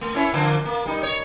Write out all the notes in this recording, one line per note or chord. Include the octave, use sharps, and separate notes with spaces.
A3
C#4 E4 C#5
D3 F3 A#3
A#3
G3 D#4
C#5